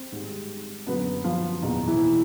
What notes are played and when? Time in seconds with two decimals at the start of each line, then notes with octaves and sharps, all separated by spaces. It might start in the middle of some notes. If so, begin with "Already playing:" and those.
Already playing: C4
0.12 G#2 D#3 G3
0.87 F#2 D3 F#3 A#3 B3 B4
1.24 F3 F4
1.62 E2 B2 D#3 F#3 A#3 D#4
1.87 E3 E4